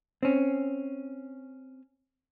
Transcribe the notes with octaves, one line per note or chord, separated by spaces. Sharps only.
C4 C#4